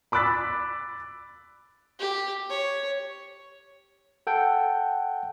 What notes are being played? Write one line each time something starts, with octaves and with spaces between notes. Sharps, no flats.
B5 D6 E6 F#6 A6 B6
G4
C#5
A4 F#5 G5 A5